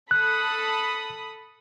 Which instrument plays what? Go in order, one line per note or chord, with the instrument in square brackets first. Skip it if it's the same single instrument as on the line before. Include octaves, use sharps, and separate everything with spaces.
[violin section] A4 B5 D#6 [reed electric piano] F#6